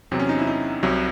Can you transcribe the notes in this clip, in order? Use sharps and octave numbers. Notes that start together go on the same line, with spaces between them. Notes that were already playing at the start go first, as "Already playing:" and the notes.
E2 C3 F#3 C4
C#4
D#4
E4
D#4
C2 C3 F#3